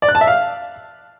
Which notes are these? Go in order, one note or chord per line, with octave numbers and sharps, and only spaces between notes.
D5
F#6
A5
E5
F5